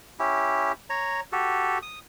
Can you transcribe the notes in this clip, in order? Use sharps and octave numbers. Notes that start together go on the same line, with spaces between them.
C#4 E4 G4
C#5 A#5
F#4 G4 A4
D#6